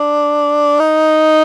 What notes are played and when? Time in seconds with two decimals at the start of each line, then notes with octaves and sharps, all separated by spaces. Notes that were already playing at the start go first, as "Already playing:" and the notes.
Already playing: D4
0.80 D#4